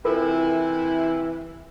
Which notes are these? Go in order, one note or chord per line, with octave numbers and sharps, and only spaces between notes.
C3 E3 E4 F4 A4 A#4